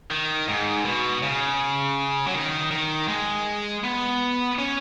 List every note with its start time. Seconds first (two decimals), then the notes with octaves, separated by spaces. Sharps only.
0.11 D#3
0.48 G#2
0.85 B2
1.23 C#3
2.26 F#3
2.34 D#3
2.71 D#3
3.09 G#3
3.84 B3
4.58 C#4